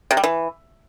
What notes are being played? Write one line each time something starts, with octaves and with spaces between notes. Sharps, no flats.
C3
G3
E3